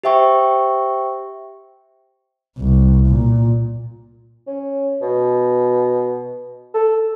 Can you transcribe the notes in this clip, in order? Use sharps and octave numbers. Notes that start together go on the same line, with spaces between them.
G4 C5 E5 G5 C#6
C2
A#2
C#4
B2
A4